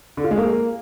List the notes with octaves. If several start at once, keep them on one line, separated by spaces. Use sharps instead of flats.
D3
F4
G#3
A#3